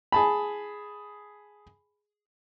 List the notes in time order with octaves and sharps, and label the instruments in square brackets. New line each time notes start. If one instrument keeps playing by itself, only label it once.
[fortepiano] G#4 A5 B5